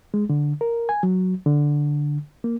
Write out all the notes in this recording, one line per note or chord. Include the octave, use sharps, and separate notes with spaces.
G#3
D3
A#4
G#5
F#3
D3
A#3